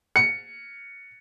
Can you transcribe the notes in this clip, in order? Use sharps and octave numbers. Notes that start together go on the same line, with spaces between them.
C#7